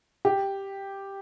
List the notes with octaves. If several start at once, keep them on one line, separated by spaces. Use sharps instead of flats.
G4